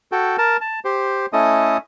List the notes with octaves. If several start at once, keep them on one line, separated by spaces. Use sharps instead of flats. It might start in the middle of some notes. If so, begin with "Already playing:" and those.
F#4 A4 G5
A#4 A5
A5
G4 C5
A3 C#4 E4 A4 D#5 D#6